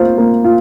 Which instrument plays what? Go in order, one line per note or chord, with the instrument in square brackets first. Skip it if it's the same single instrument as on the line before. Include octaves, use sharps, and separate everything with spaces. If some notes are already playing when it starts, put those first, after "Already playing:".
Already playing: [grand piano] A#3 F4 C5
A#3
F4